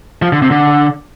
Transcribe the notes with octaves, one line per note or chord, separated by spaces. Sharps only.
F3
D3
C3
D3